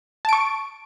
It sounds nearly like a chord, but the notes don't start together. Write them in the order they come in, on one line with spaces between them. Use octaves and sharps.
A5 D7 C#6